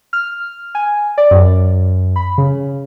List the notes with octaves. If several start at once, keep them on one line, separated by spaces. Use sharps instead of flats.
F6
G#5
D5
F#2
B5
C#3